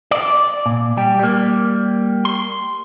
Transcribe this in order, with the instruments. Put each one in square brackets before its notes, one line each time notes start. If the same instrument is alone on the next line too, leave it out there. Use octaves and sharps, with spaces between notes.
[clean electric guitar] D5
A#2
G3 G4
G3 A#3
C6